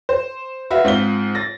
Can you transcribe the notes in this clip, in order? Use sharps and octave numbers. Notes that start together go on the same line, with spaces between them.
C5
F#4 B4 E5 F5
G#2 C4 F4 B6 G7
A6 A#6